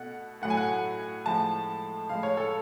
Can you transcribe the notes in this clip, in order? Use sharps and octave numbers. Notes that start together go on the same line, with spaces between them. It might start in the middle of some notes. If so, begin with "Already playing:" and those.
Already playing: B2 A3 F#5
A2 F#3 A3 F#5
G#5
F#5
A2 F3 G#3 A5
A2 F3 G#3 F5
C#5
A4